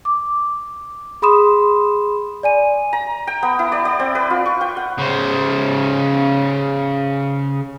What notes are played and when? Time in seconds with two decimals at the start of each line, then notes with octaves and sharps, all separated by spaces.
0.05 D6
1.22 G#4 B5 C6 D#6 E7
2.43 D5 G#5 D#7
2.93 A#5
3.27 G5
3.43 B3
3.59 E4
3.72 D5
3.85 D5
4.00 C4
4.15 B4
4.30 F4
4.46 C#6
4.61 G5
4.77 F#5
4.99 C#3 C5